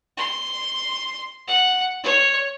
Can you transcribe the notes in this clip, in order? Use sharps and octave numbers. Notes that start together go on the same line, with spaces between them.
C6
F#5
C#5